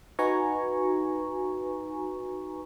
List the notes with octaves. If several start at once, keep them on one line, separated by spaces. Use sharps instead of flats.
D#4 F#4 B4 G#5 A#5 C#6